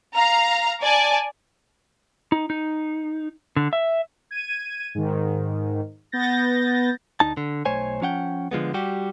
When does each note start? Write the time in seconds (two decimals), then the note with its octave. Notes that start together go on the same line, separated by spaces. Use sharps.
0.14 F5 A#5
0.82 D5 G#5 A5
2.32 D#4
2.50 D#4
3.57 D3
3.73 E5
4.31 G#6 D#7
4.95 G#2 D#3
6.12 B3 G6 A6 A#6
7.20 D2 D#4 A5
7.37 D3
7.65 B1 A3 C5 C#5 G#5
8.01 F3 C#4 F#5 G5
8.51 D3 F3 G#3 B3
8.74 G3 F#4 G4